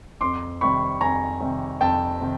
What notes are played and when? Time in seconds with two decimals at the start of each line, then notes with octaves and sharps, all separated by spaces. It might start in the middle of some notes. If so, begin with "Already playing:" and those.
0.21 F2 C6 D6
0.61 C3 D#3 G3 B5 C#6
1.01 F2 G#5 A#5
1.40 C3 D#3 G3
1.80 F2 G5 A5
2.20 C3 D#3